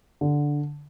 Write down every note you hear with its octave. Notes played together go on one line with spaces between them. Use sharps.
D3